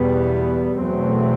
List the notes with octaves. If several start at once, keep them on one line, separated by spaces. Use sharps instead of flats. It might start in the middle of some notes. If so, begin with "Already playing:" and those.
Already playing: E2 B2 G3 B3
E2 B2 F#3 A3 C4